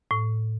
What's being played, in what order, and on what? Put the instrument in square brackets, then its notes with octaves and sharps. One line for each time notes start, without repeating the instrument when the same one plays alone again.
[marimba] A2